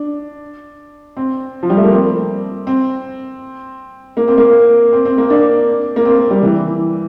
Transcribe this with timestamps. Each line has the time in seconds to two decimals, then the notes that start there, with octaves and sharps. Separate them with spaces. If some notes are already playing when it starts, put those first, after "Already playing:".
Already playing: D4
1.17 C4
1.63 F3
1.70 G3
1.77 A3
1.84 A#3
1.92 C4
2.67 C4
4.17 A#3
4.28 C4
4.38 A#3
4.93 C4
5.05 C4
5.18 A#3
5.30 D4
5.96 A#3
6.05 C4
6.18 A#3
6.31 G3
6.43 E3